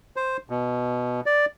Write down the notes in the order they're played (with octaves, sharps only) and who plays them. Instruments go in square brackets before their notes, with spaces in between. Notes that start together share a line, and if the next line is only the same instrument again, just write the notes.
[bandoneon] C5
B2
D5